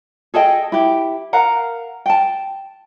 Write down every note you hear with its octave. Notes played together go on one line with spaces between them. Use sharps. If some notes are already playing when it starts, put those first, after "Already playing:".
G#4 A4 D#5 G5
E4 G4
A#4 F5 F#5 A#5
G5 A5